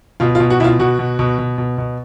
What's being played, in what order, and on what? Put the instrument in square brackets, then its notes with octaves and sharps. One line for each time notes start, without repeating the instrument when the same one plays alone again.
[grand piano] B2 F4
F4
B2
F#4
B2 E4 F4
B2 F#4
B2
B2
B2
B2
B2